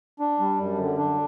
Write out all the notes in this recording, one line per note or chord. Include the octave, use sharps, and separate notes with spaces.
D4
G3
F#2
D3
D4